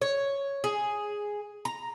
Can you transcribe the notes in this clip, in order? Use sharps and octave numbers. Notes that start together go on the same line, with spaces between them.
C#5
G#4
A#5